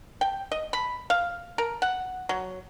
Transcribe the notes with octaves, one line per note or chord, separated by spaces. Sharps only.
G5
D#5
B5
F5
A#4
F#5
F#3